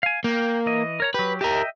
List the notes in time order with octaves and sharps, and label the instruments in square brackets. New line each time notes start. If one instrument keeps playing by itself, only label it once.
[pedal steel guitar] F5 G#5
[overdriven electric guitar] A#3 [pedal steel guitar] G5
[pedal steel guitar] E3 D#5
A#4 C#5 A#5
[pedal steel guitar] F#3 G4 [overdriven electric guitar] B4
[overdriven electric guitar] G4 A#4 [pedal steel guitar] D#5 E5 G5